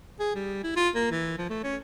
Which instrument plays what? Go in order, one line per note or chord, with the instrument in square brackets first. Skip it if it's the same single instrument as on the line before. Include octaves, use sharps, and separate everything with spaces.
[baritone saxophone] G#4
G3
E4
F4
A#3
E3
F3
A3
C#4